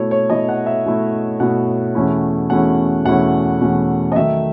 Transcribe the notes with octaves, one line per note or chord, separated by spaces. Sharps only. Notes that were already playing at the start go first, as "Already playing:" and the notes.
Already playing: B2 A3 E4 C#5
C#5
B2 A3 E4 D#5
F#5
E5
B2 A3 E4
B2 A3 E4 F#5
E2 B2 A3 C#4 E4
E2 B2 A3 C#4 E4 F#5
E2 B2 A3 C#4 E4 F#5
E2 B2 A3 C#4 E4
D#5
D#3 F#3 A3 E5